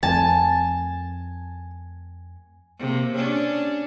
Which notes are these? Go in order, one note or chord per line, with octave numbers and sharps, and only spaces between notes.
F2 A3 G#5 A5
C3 A#3
C#4 D4